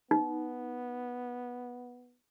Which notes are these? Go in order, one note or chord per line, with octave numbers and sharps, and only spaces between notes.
B3 D#4